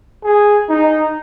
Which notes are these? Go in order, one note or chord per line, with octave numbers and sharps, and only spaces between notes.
G#4
D#4